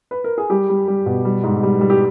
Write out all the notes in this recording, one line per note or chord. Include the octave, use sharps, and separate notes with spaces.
B4
A#4
G#4
G3 G4
G3
G3
B2
G3
G#2
G3
G3
G4